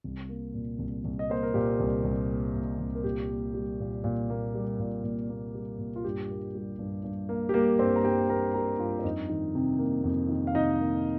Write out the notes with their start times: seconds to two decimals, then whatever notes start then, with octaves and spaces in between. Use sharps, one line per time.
0.04 C2
0.29 A#3
0.54 A#2
0.79 C2
1.04 C2
1.19 D#5
1.29 A#3 C5
1.43 A#4
1.54 A#2 G4
1.80 C2
2.04 C2
2.30 A#3
2.55 A#2
2.79 C2
2.95 A#4
3.04 A#2 G4
3.30 A#3
3.54 G3
3.80 A#2
4.04 A#2
4.30 A#3
4.55 G3
4.80 A#2
5.04 A#2
5.29 A#3
5.55 G3
5.79 A#2
5.96 F4
6.04 G2 G4
6.30 A#3
6.55 G3
6.79 G2
7.04 G2
7.29 A#3
7.49 G4
7.54 G3 A#3 A#4
7.79 G2 C4 C5
7.96 A#5
8.04 G2 G4 G5
8.29 A#3 A#4 A#5
8.54 G3 A#4 A#5
8.79 G2 F4 F5
8.99 C5
9.04 F2 D#4 D#5
9.29 D#3
9.55 C3
9.79 A#3
10.04 F2
10.29 D#3
10.47 F5
10.55 C3 D#4 D#5
10.80 A#3